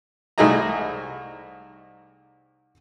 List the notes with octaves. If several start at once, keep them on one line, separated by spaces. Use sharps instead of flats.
C2 A3 D#4 G#4 D#5 A#5